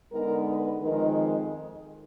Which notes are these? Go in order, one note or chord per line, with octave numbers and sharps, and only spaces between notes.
D3 G#3 B3 D#4 A#4
B4
F2 D#3 G#3 D#4 A#4